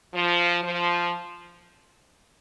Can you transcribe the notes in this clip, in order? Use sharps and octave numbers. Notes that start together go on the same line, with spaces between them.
F3
F3